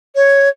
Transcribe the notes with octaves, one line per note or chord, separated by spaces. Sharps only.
C#5